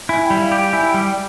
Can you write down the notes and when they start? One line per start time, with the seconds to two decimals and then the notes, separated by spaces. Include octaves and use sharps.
0.09 E4 G#5
0.25 G5
0.30 G3
0.41 F5
0.52 G4
0.58 G5
0.73 E4 G#5
0.90 G3 G5
1.05 G5